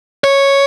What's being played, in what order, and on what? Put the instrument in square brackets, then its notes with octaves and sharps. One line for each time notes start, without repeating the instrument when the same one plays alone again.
[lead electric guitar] C#5